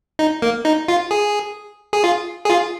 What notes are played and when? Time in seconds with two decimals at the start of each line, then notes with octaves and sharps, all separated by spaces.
0.19 D#4
0.42 A#3
0.65 D#4
0.88 F4
1.11 G#4
1.93 G#4
2.04 F4
2.45 G#4
2.50 F4